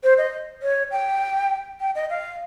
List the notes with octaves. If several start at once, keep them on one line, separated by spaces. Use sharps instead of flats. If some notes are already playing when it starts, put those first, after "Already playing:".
C5
D#5
C#5
G5
G5
D#5
F5